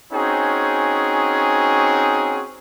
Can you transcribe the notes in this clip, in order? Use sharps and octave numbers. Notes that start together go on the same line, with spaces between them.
C4 C#4 D#4 F#4 G#4